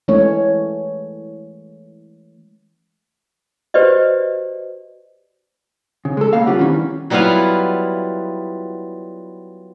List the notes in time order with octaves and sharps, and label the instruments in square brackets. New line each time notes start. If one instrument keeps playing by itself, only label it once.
[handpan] E3 G#3 A3 C#4 C#5
[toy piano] F#4 G4 B4 C5 D5 D#5
[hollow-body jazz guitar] C#3
G#3 A4
C#3 A#3 F5
G3 C#4 F4 G4 F#5
D#3 E3 G3 C4 C#4
[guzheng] F#3 G3 B3 E4 F4 F5